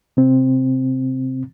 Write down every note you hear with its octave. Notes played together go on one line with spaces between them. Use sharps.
C3 C4